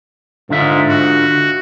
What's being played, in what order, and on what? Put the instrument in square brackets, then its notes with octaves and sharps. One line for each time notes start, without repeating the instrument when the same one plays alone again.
[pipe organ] G#2 [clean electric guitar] D3 F4 E5
[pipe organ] F#4